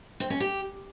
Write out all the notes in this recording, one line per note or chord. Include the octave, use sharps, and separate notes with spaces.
C4
C#4
G4